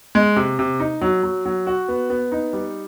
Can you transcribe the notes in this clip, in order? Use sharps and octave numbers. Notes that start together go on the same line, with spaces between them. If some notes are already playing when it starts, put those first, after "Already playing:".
G#3
C3
C3
D#4
F#3
F#3
F#3
F#4
B3
B3
D#4
G3